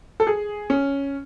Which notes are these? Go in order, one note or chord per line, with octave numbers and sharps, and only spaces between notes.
A4
G#4
C#4